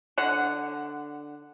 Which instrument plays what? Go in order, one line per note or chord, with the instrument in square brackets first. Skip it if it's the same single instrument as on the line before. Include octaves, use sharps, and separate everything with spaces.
[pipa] D3 F#5